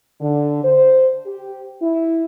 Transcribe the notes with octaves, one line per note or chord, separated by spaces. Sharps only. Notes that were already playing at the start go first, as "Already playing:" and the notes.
D3
C5
G4
E4